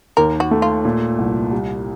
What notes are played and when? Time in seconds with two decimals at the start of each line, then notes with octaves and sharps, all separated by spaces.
0.17 D#2 A#4
0.40 F#4
0.51 A3
0.62 F4
0.85 A#2
1.18 C2
1.52 G3